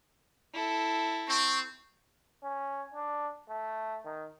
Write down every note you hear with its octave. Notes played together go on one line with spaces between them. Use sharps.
E4 A4
C4 C#6
C#4
D4
A3
D#3